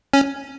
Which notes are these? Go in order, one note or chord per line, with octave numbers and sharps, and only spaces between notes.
C#4